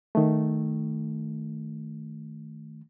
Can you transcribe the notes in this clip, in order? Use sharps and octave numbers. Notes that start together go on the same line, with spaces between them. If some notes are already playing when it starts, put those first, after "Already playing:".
D#3 A3